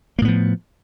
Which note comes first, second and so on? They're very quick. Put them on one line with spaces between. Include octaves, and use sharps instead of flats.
A#3 A2 B3 F3